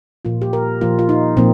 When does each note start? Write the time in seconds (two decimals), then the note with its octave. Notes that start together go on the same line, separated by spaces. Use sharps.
0.25 A#2 F3 A#3 F4
0.42 G4
0.53 A#4
0.81 A#2 F3 A#3 F4
0.99 F4
1.09 D#4
1.37 A#2 F3 A#3 C4